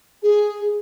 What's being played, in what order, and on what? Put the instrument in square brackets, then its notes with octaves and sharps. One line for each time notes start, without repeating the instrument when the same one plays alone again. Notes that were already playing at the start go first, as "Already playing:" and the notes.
[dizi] G#4